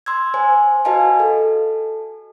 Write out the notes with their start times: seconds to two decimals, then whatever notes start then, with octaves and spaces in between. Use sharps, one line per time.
0.06 C6 E6 G#6
0.34 C5 G#5
0.85 F#4 B4 D#5 F5 G#5 A5
1.20 A4